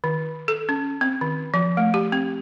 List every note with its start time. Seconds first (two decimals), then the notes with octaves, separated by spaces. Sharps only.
0.04 D#3
0.48 A4
0.69 C#4
1.01 C4
1.21 D#3
1.54 F3
1.77 A3
1.94 G4
2.12 C4